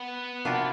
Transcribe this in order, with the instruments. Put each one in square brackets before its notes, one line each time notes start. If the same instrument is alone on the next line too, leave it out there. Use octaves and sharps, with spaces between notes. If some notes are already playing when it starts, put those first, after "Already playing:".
Already playing: [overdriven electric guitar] B3
[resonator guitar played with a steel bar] C3 F3 A#3 D4 F#4